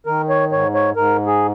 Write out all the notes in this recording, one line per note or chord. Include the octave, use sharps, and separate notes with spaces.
D#3 A#4
C#5
G#2 C#5
C#5
G#2 A#4
G#4